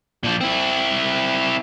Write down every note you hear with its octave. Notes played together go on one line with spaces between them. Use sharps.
A#2 F3
C4 E4